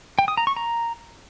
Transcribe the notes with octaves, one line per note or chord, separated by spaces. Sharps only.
G5
D#6
A#5
C#6
A#5